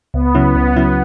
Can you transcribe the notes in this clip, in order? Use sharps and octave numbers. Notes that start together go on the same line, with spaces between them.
C#2 B3
C#3 F#3 C#4 E4
C#2
C#3 F#3 C#4 E4